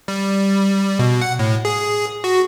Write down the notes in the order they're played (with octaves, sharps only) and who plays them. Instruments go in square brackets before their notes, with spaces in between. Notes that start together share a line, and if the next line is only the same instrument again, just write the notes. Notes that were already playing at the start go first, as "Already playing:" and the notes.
[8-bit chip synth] G3
B2
F#5
A2
G#4
F#4